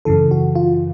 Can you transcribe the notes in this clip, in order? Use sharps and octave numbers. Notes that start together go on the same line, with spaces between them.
F#2 C#3 E3 A4
F#4
F4